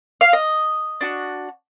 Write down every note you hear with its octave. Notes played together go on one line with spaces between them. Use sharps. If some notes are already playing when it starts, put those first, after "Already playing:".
F5
D#5
D4 F#4